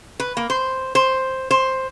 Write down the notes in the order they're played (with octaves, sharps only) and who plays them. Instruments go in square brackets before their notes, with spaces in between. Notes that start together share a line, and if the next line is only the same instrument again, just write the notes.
[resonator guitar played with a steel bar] B4
A#3
C5
C5
C5